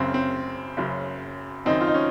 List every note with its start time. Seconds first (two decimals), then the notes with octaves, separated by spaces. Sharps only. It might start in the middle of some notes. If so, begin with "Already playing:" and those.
Already playing: F#1 F#2 C#3 C4
0.14 C4
0.77 F#1 F#2 C#3
1.65 F#1 F#2 D#3 C4 D#4
1.81 F4
1.87 D#4
1.94 C#4